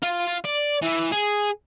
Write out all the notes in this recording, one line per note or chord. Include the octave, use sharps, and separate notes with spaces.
F4
D5
E3
G#4